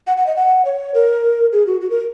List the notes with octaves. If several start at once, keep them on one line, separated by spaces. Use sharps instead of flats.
F#5
F#5
D#5
F#5
C#5
A#4
G#4
F#4
F#4
A#4